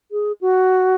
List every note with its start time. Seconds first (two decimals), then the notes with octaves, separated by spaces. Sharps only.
0.11 G#4
0.41 F#4